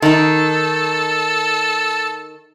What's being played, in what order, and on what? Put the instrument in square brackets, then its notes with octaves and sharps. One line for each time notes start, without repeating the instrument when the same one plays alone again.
[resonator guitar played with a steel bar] D#3 D#4 [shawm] A4